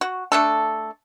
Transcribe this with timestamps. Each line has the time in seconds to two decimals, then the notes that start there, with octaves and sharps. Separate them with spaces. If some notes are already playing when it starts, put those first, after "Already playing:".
0.01 F#4
0.32 A3 D4 A4